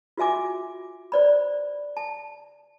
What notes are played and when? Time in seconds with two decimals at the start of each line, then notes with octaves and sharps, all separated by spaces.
0.17 F4 F#4 E5 G#5 D6
1.12 C5 D5 B5
1.97 A5